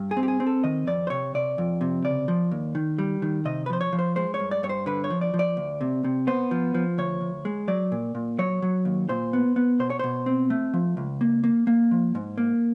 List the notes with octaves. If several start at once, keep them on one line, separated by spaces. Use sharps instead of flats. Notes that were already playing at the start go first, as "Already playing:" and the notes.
Already playing: G2
G#4
C4
G4
G#4
C4
A4
D#3 D#5
F2 D5
C5
C3 C#5
C3 D5
F2
C3
C#3 D5
F3
D#2
D#3
G3
D#3
C3 D#5
B4
F3 C5
C#5
F3
C5
G#3 C5
C#5
G2
D5
G2 C#5
C5
D3 B4
C#5
F3
D5
F3
D5
D2
C3
C3
B3 C5
F3
F3
D2 C#5
D2
G#3
F#3 D5
A#2
A#2
F#3 C#5
F#3
D#2
A#2 C5
B3
B3
B2 C5
C#5
B2 C5
C4
A3
F3
C#2
A#3
A#3
A#3
F3
G#2
A#3